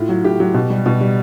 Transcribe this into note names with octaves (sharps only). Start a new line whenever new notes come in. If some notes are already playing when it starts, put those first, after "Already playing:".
Already playing: A2 F4
F#3
A2 G4
F#3
B2
G3
B2
G3